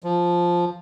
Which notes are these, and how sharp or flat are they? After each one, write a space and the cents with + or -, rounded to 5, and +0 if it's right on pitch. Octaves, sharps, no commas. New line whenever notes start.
F3 +0